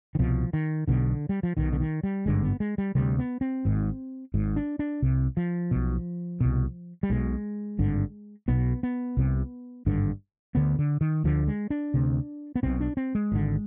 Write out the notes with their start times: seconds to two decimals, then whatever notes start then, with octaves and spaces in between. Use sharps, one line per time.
0.15 D#3
0.19 C2 B2 F3
0.53 D#3
0.88 B1 B2 D3
1.29 G3
1.43 F3
1.57 B1 B2 D#3
1.73 D3
1.80 D#3
2.03 G3
2.26 G#1 G2 D3 G#3
2.43 B3
2.60 G#3
2.78 G3
2.95 D2 C3 G3
3.19 B3
3.41 C4
3.65 G#1 G#2
4.34 G#1 G#2
4.56 D4
4.79 D4
5.02 C2 C3
5.37 F3
5.71 B1 B2
6.41 C2 B2
7.03 G3
7.10 B1 B2 G#3
7.79 G#1 G2 D3
8.48 B1 B2 B3
8.83 B3
9.17 C2 C3
9.87 G#1 G2 D3
10.55 D2 D3 B3
10.79 D3
11.01 D#3
11.24 D2 D3 F3
11.47 G#3
11.70 D4
11.94 D2 C3
12.56 B3
12.63 B1 B2 C4
12.80 D4
12.97 C4
13.15 G#3
13.32 G#1 G2 D3